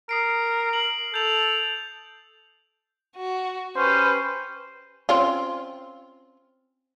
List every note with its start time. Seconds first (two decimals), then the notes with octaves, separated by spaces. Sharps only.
0.09 A#4 D#6 C7 D7
0.69 C7 F#7
1.14 A4 G6 F7
3.17 F#4
3.76 C#4 G4 B4 C5
5.09 C4 C#4 F4